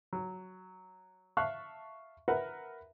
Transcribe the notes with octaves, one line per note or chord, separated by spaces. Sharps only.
F#3
E5 F5 A5 C#6 F#6
A#4 B4 E5 F#5